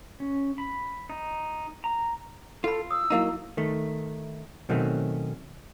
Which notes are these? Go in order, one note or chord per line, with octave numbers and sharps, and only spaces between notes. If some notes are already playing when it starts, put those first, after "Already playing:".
C#4
B5
D#4
A#5
F4 A4 B4 B5
D#6 E6
F#3 A#3 D#4 E4 F5 A#5
D#3 A3
B2 D#3 F#3 A3 C4 C#4